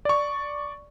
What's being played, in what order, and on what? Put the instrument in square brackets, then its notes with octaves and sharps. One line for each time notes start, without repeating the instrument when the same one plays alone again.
[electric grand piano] D5 C#6